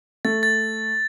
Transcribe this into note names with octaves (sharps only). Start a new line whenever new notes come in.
A3 A6
A6